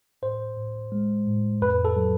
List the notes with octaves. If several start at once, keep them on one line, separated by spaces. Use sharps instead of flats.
A2 C5
A2
G#3
A2
F2 B4
A4
F#3